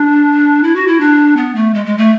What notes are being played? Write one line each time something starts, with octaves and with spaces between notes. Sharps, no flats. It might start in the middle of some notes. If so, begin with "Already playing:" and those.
Already playing: D4
E4
F#4
E4
D4
B3
A3
G#3
G#3
A3